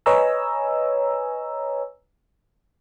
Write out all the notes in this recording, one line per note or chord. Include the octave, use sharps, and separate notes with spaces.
B4 C#5 D#5 G#5 A#5 E6